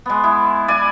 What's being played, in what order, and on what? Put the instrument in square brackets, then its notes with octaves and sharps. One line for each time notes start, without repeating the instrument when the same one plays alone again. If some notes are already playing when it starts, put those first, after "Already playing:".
[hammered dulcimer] G#3 B3
E4
E4 D5 G#5